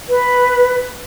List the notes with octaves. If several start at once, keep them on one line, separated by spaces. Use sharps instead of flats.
B4